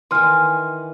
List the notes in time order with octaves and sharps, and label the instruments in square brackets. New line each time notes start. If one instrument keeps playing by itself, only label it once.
[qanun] D#3 E3 [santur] F#5 G#5 [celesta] C6 F6